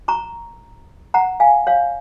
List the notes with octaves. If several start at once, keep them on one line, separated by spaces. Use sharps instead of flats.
A#5 C#6
F#5 A#5
F5 G#5
C#5 F5